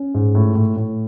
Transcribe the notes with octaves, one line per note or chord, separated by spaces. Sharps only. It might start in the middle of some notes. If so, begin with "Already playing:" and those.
Already playing: C#4
G#2
A2
A2
A2